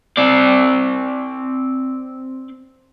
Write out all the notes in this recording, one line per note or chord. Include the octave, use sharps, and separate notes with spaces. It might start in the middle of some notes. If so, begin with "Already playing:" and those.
C4 D5